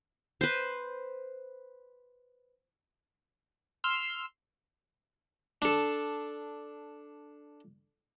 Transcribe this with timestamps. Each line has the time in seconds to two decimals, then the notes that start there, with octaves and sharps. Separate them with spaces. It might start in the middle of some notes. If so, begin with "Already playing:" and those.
0.41 B4 C5
3.84 C6 E6 F6
5.62 D4 A4